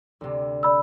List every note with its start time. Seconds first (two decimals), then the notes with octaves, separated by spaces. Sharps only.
0.21 D2 C3
0.63 D5 B5 E6